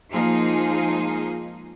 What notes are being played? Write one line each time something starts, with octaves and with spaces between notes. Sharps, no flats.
F3 G#3 A#3 D#4 F4 G#4